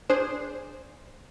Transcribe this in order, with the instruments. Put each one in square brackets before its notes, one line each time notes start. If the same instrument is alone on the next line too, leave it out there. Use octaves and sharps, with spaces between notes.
[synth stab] D4 G#4 C5